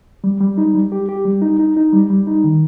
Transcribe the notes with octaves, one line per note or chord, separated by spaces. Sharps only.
G3
G3
D#4
G3
G4
G4
G3
D#4
D#4
D#4
G3
G3
D#4
D#3